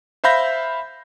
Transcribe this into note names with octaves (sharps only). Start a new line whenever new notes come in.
C5 E5 F5 B5 G6 A#6